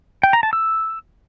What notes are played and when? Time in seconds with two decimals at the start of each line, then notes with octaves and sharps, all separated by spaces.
0.23 G5
0.33 A#5
0.43 A5
0.53 E6